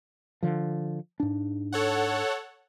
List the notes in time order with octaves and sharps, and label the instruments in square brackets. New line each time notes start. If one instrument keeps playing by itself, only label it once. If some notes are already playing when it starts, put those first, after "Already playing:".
[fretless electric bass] D3 F3
G#2 D4
[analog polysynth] A4 C#5 F#5